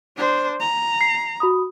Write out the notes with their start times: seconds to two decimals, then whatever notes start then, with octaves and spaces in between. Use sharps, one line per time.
0.17 D4 C5
0.60 A#5
1.01 C7
1.40 F#4 B5 D#6